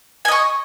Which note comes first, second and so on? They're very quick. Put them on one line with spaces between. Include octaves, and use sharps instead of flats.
G#5 D#5 C#6